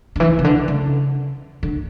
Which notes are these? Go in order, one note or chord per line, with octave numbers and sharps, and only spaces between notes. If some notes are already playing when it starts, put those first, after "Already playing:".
D3
E3
C#3
D3
C#3
D3